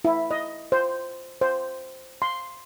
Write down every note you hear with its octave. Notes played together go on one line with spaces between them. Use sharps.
E4
D#5
C5
C5
C6